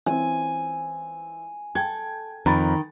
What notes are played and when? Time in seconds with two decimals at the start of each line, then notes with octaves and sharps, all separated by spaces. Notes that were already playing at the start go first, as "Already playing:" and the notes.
0.06 E3 C4 G#5
1.75 A4 G5 G#6
2.46 F2 D#3 A#5 B5 A6